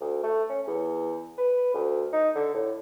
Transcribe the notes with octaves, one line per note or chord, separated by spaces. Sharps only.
D2
A3
C#4
E2
B4
D2
D#4
D3
A2